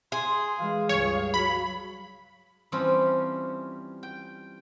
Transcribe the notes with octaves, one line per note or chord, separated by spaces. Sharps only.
G#4 C6
E3 G#3 F5
C#2 G2 C#5
F#3 B5
E3 F3 G3 C4 C#4
G5